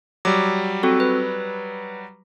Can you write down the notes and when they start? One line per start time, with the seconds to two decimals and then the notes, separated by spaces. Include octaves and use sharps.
0.25 F#3 G3 D6
0.83 C4 F#4 A4
1.00 B4